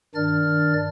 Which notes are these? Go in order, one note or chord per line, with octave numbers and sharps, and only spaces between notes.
G2 D#3 D4 D5 F6 A6